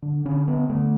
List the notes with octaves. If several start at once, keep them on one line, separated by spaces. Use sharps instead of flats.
D3
D3 C#4
D3 B3
D3 A3